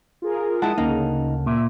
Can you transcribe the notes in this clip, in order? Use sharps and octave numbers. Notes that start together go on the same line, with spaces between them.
F4 G#4 A#4
G#3 E4 F#5 A5 D#6
D2 C#3 A#3 D#4
A#2 E5